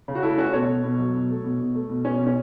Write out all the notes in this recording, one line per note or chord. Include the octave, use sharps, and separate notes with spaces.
C#3
F#4
A3 E4 A4
A3 C#4 F#4
B2 A4 C#5
B2
B2
F#3
B2
A3
B2
B2
A3
B2
B2 C#4
B2
C#4